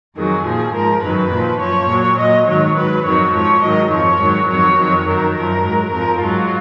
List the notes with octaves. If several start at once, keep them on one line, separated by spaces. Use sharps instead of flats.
F2 D#3 F#3 G#4
A#2 F3 G#4
G#2 F3 A#4
F#2 D#3 F#3 B4
A#2 F3
F#2 F3 C#5
A#2 F#3
A#2 F#3 D#5
G#2 D#3 F#3 C#5
G#2 F#3 B4
F2 D#3 F#3 C#5
G#2 F3 C#5
G#2 D#3 F#3 D#5
F2 F3 C#5
G#2 D#3 F#3
F2 D#3 F#3 C#5
F2 D#3 F#3
F#2 D#3 F#3 A#4
F#2 F3 A#4
G#2 F#3
F2 F3 A#4
G#2 F#3 F4